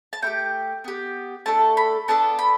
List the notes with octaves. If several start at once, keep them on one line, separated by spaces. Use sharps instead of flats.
A5
A3 E4 G4 G5
B3 G4
A3 D4 A4 A5
B5
B3 D4 A4 A5
B5